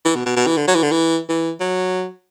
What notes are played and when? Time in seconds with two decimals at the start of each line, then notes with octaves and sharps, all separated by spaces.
0.05 E3
0.15 B2
0.26 B2
0.36 B2
0.47 E3
0.57 D3
0.68 F#3
0.75 E3
0.83 D3
0.92 E3
1.29 E3
1.60 F#3